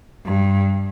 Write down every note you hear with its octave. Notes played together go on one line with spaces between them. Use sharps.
G2